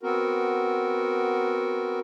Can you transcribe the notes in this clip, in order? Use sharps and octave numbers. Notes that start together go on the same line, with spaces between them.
B3 C4 F#4 A#4